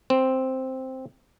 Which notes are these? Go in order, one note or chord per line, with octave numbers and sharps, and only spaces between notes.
C4